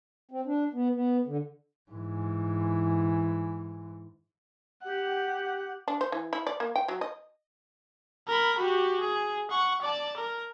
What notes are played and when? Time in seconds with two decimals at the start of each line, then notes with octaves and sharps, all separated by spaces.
0.31 C4
0.46 D4
0.73 B3
0.94 B3
1.26 D3
1.92 G#2 E3
4.84 G4 F#5
5.88 D4
6.01 C5
6.12 E3
6.33 E4
6.47 D5
6.60 A#3
6.76 G5
6.88 F#3
7.01 D#5
8.28 A#4 B5
8.58 F#4 G4
9.00 G#4
9.51 F#5 C#6
9.82 D5 A5
10.17 A#4